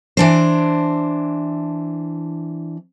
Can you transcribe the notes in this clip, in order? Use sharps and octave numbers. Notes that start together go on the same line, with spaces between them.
E3 D4 C5